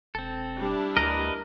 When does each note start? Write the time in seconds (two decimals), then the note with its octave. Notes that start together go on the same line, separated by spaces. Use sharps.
0.15 E1 C4 A4
0.59 G3 D4 E4
0.97 D2 A#4 B4 D#5